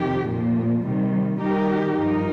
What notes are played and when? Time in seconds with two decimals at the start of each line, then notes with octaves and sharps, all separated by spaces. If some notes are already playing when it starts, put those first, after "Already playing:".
Already playing: F2 C3 D#3 G4
0.28 A#2 F3 A#3
0.84 C3 D#3 G3
1.41 D#3 G3 D#4 G4 A#4
1.97 G2 F3 D#4 A#4